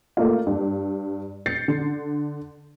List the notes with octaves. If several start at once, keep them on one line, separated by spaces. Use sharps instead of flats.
A3 A#3 F4
G2
G6 A6 C7 C#7
D3